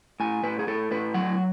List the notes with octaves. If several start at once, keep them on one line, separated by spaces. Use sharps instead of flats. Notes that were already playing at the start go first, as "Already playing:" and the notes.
A2 G#5
A2 B4
G#4
A2 A4
A2 B4
F#3 F#5